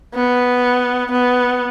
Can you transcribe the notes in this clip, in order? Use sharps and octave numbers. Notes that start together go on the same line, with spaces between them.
B3
B3